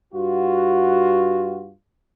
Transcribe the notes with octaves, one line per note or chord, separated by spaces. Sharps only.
G2 F4 F#4